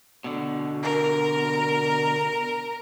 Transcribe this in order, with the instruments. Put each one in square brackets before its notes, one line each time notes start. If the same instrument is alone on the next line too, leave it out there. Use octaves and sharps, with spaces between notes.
[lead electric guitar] B2 D3
[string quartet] A#4